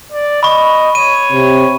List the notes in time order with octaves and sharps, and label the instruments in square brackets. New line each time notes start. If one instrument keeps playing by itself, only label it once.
[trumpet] D5
[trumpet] D#5 [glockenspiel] B5 C#6
[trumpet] C#5 [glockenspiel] D#7
[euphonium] C3